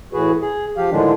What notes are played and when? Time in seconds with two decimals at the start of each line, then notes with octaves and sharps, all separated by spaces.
0.13 A2 E3 F#4 G#4 B4
0.41 G#4
0.77 F3 G4 F5
0.91 A2 D3 D#3 F3 G#3 D4